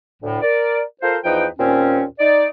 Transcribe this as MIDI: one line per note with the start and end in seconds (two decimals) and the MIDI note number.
0.22 0.41 38
0.22 0.41 45
0.41 0.81 70
0.41 0.81 74
1.02 1.17 65
1.02 1.17 69
1.02 1.17 70
1.02 1.17 72
1.24 1.46 40
1.24 1.46 53
1.24 1.46 63
1.24 1.46 71
1.24 1.46 79
1.58 2.03 39
1.58 2.03 46
1.58 2.03 60
1.58 2.03 61
2.20 2.46 63
2.20 2.46 74